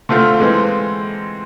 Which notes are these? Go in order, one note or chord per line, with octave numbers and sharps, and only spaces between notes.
D3 A3 C4 F4
E3 G#3 C4